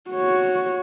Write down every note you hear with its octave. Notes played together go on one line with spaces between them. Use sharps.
F#4 C#5